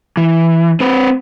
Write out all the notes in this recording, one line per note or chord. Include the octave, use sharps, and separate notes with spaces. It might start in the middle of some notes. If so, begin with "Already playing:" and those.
E3
C4 B4